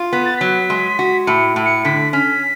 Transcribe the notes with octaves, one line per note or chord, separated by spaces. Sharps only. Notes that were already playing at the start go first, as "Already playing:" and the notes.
Already playing: F4
B3 B6
A6
F#3 B6
G#3
F#4
A2 C#7
A2
C#7
D3 B6
C#4 B6